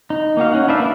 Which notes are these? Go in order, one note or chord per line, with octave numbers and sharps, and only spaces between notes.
D#4
A#3 D#4 F#4 F5
C#4 D#4 F#5
D4 B4 D5 E5 F5
A#3 D5